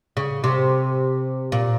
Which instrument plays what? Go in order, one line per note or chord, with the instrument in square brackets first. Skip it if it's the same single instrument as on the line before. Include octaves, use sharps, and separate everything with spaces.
[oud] C#3
C3
A#2